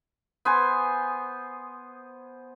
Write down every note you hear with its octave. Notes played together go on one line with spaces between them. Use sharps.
B3 C5 G#5